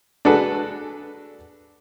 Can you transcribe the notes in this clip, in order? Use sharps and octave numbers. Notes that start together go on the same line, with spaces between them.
D4 F#4 G#4 A4 B4